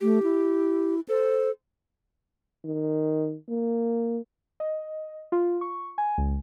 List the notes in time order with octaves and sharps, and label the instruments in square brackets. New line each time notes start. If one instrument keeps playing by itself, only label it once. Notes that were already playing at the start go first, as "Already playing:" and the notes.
[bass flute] A3 [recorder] G4
[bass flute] E4
[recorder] A4 [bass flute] C5
[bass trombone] D#3
A#3
[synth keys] D#5
F4
C#6
G#5
C#2